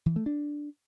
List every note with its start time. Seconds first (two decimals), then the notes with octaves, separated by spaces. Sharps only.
0.06 E3
0.16 A3
0.26 D4